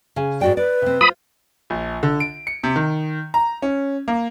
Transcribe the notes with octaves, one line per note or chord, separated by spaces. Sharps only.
C#3 G#5
G#2 F#4 D5 G5
B4 D5
C3 C4
F4 C5 B5 D#6
A#1
D3
D7
C#7
C3
D#3
A#5
C#4
A#3